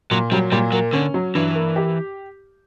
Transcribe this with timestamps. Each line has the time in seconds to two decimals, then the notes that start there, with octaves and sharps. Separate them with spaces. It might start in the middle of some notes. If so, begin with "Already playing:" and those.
0.11 A#2 F#3
0.31 F#3 G3
0.52 A#2 G3
0.72 F#3 A#3
0.93 D3 C#4
1.14 F#3
1.35 G2 E3
1.55 A#3
1.76 G4